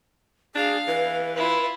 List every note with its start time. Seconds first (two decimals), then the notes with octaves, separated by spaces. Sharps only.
0.55 D4 G#4 F5
0.87 E3 B4
1.36 E4 F4